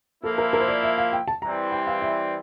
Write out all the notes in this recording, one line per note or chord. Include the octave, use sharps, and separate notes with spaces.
F3 A#3 E4 A4
A#4
A#4
C5
D5
E5
F5
G5
A5
E3 G3 C4 A#5
G5
F5
E5